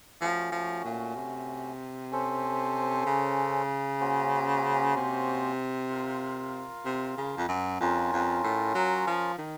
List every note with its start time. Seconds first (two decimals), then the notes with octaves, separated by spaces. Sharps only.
0.21 F3 A3 C#4 F#4
0.52 F3
0.85 A#2
1.16 C3
2.11 C#4 A4 C5
3.06 C#3
4.00 A#3 C#4 F#4 C5
4.96 C3
5.90 F4 A#4 F5
6.85 C3
7.17 C#3
7.37 F2
7.48 F#2
7.80 F2 C#4 F4 A#4
8.12 F2
8.44 A2
8.75 F#3
9.07 F3
9.38 D#3